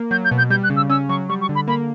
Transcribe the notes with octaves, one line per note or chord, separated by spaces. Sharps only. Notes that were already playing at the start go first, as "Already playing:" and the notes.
Already playing: A#3
F#3 G6
G6
B2
G6
G3 G6
F#6
C#3
E6
C#4 E6
F#3 C#6
G3 C#6
C#6
D3
B5
A#3 B5